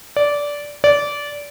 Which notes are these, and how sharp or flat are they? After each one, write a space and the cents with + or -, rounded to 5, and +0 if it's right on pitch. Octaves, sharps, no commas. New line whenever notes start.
D5 -15
D5 -20